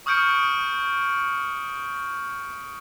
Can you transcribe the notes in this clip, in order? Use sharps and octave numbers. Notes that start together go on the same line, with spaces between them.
C#6 D#6 F6 G6 C#7 D7